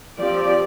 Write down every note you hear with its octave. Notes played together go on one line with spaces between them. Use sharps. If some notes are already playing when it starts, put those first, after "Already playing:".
F3 C4 G4 D5